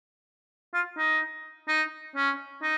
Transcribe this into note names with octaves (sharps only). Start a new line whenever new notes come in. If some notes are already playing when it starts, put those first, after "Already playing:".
F4
D#4
D#4
C#4
D#4